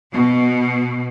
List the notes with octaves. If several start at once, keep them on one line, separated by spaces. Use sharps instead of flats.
B2